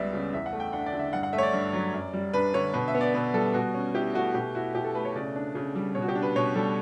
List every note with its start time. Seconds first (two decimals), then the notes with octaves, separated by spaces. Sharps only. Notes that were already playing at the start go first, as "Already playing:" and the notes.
Already playing: C#2 G3 B3 D5 E5
0.13 C#3
0.33 E2 E5
0.46 F#5
0.53 A3
0.60 G5
0.73 D4 F#5
0.86 D5
0.93 D3
0.99 E5
1.13 G2 F#5
1.23 F#5
1.33 A3 E5
1.38 C#5
1.43 D5
1.53 G2
1.73 F#3
1.94 F#2
2.13 G3
2.33 D4 B4
2.54 D3 C#5
2.74 B2 B4
2.88 E5
2.95 B3
3.01 D5
3.14 B2 B4
3.34 G3 A4
3.54 B2 F#4
3.74 C#4
3.94 E4 G4
4.14 A3 F#4
4.35 B2 G4
4.55 E4 F#4
4.74 B2 G4
4.84 A4
4.95 A3 B4
5.05 C#5
5.16 C#3 D5
5.36 D4
5.55 C#3
5.75 G3
5.95 B2 C#5
6.02 F#4
6.08 G4
6.15 D4
6.22 B4
6.36 B2 C#5
6.55 G3 A4